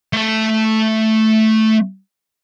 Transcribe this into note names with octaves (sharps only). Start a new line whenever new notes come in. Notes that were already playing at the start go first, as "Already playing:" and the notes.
A3 A5